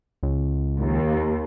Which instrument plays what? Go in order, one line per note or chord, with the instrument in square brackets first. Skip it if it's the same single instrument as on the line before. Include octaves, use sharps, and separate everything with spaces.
[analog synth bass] C#2
[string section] D#2